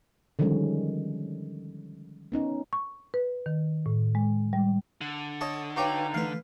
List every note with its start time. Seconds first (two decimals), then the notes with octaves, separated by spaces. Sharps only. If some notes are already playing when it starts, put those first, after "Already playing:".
0.39 D3 D#3 F3 G3 G#3 C#4
2.32 B3 C#4 D#4
2.73 C#6
3.14 B4
3.46 D#3
3.86 A2
4.15 G#3
4.53 G3
5.01 D3
5.41 A4 C#5 D#5
5.76 D#4 F#4 G4 B4 C#5 F5 G5
6.14 E3 A3 B4 F5